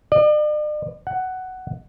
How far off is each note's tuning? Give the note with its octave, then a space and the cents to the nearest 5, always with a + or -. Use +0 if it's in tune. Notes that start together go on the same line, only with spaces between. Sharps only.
D5 +45
F#5 +10